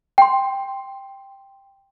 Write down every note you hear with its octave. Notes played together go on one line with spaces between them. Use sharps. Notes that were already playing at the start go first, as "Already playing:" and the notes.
G5 C6